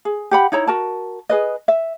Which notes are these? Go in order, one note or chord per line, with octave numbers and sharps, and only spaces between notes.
G#4
G4 F#5 B5
D#4 E4 C#5 A#5
F#4 A#4 A5
G#4 B4 D#5
E5